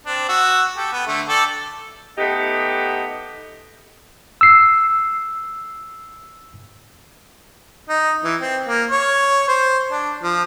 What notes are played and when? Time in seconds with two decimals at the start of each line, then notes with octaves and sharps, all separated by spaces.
0.06 C4 D4
0.29 F#4 E6
0.77 G4 A4
0.93 B3
1.07 D3 A3
1.29 A4 D5 G5
2.18 A3 B3 D#4 G4
4.41 E6 C7
7.89 D#4
8.24 E3
8.40 C4
8.68 A#3
8.91 C#5
9.48 C5
9.92 D4
10.23 F3